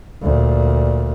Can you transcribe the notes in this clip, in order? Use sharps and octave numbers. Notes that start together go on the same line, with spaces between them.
D2 A#2